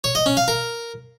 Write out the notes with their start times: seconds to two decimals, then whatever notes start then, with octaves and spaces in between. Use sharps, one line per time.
0.04 C#5
0.15 D#5
0.26 C#4
0.37 F5
0.48 A#4